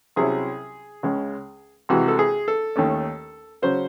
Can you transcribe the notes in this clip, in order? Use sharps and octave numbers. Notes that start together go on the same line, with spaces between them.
C2 C3 F#3 C#4 E4 G#4
C#2 C#3 G#3 C#4
C2 C3 E3 G#3 F#4
A4
G#4
A4
D#2 D#3 A3 C#4
C#3 F#3 C#4 C5